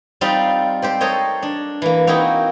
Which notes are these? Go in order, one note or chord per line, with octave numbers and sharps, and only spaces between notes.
G3 C4 D#4 F4 C5 F5
C4 G4 C5
A4 A#4 C5 C#5 D#5
D4
E3 A#3
A#3 C4 D#4 E4 F#4